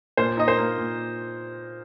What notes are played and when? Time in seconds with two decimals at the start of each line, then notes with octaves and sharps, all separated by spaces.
0.17 A#2 C5
0.37 D#4 D#5
0.48 C5
0.57 A#3
0.78 A#2